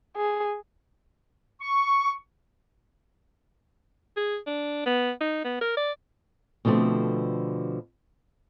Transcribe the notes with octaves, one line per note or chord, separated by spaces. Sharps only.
G#4
C#6
G#4
D4
B3
D#4
B3
A#4
D5
B2 D3 F3 A3 C4